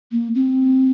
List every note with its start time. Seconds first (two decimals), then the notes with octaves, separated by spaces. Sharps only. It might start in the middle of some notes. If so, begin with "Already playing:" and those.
0.12 A#3
0.35 C4